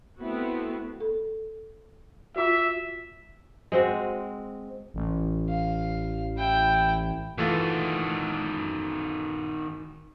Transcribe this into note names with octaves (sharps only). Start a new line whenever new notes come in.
A3 B3 C4 E4 F#4
A4
F4 F#4 E5
G#3 C4 F#4
A1
F5
E4 G5
D#3 E3 A3 F4 F#4